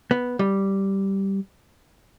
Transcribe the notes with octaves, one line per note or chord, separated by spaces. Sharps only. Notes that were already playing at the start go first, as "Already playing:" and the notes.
B3
G3